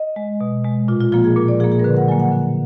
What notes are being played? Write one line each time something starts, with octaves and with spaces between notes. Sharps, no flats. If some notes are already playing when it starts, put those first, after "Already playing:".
Already playing: D#5
G#3
B2
G#3
A#2 F4
F4
F3 A#3 F4
G#4
A#2 A#4
D5
F3 A#3 G#4
G#4
A#4
D3 B4
F#5
F#3 A#3 G#5
F#5
D3